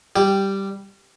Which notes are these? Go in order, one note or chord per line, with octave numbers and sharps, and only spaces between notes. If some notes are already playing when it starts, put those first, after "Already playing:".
G3 G4